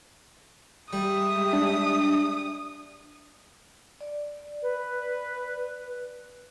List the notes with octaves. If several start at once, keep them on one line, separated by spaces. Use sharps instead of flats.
G3 G#3 G4 E5 D#6
D4
D5
B4